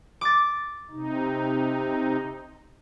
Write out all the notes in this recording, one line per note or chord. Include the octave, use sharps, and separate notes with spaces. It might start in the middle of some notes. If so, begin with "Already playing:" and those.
D6 A6
C3 D#4